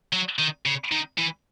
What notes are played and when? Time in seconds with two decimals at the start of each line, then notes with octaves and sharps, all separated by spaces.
0.13 F#3
0.39 D#3
0.66 C#3
0.92 D#3
1.18 E3